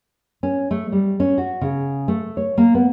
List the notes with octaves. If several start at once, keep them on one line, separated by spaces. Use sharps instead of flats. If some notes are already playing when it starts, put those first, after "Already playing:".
C#4
A3
G3
C#4
F#4
C#3
A3
C#5
A#3
B3